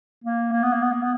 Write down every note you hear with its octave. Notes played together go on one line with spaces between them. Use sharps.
A#3
A#3
B3
A#3
B3
A#3
B3